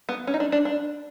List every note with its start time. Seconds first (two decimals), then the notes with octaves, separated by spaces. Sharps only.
0.09 B3
0.27 C#4
0.34 D#4
0.40 D4
0.52 D4
0.65 D4